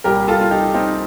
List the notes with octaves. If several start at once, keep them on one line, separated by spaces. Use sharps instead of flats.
C2 A#2 G3 A#3 G4 A#4
F4 A4
F4
D#4 G4
C4 D#4